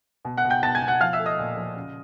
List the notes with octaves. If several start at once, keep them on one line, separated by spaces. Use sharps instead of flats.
B2
F#5 F#6
B2
G5 G6
B2 A5 A6
G#5 G#6
B2
F#5 F#6
F3 F5 F6
E5 E6
A3
D#5 D#6
A#2
F3
C#3